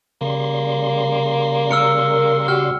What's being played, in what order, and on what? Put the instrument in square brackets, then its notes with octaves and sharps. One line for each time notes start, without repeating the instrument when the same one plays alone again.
[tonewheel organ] C#3 G3 C6 [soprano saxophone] A#3
[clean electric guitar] A#4 [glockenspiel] E6 F6 C#7
[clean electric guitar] F#4 [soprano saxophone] G4 [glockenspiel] F6